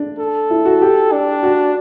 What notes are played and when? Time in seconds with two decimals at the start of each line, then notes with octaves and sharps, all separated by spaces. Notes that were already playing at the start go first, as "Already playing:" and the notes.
Already playing: D4
0.19 A4
0.50 E4
0.65 F#4
0.82 G4
1.12 D4
1.43 F#4